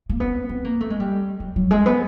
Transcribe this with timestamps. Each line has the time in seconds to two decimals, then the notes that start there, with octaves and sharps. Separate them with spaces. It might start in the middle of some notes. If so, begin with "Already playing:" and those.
0.09 A#3
0.20 B3
0.49 C4
0.65 A#3
0.81 A3
0.90 G#3
1.00 G3
1.40 F#3
1.56 F#3
1.71 G#3
1.86 B3